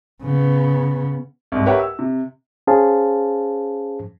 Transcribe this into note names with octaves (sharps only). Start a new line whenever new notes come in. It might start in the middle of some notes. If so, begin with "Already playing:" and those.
C#3 B3
C2 G#2
G4 A#4 B4 C#5 E5 F#5
E6
C3
C#4 G#4 C5 F5 A5